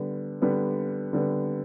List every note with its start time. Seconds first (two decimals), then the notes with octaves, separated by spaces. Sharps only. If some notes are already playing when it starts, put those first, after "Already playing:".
Already playing: D3 G3 B3
0.42 D3 G3 B3
1.13 D3 G3 B3